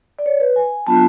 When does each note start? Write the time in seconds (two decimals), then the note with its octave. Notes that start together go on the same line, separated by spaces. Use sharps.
0.19 D5
0.26 C#5
0.40 B4
0.56 G#5
0.87 F#3 B3 D4 F4 A5